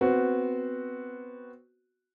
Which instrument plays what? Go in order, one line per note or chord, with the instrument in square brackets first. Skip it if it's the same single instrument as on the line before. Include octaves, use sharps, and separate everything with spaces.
[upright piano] B3 C4 F#4